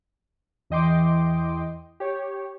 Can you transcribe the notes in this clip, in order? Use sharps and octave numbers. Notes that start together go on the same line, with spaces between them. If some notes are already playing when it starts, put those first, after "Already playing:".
E2 E3 D#5 G5 C6 D6
G4 C#5